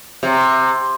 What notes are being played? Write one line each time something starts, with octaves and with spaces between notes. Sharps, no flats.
C3